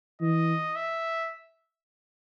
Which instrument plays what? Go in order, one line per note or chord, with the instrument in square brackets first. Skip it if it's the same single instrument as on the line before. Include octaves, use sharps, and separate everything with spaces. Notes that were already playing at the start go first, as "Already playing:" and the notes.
[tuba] E3 [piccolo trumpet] D#5
[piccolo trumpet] E5